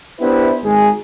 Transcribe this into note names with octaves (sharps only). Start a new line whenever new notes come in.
B3 D4 E4 G4 B4 C5
G#1 G#3 D#4 G#4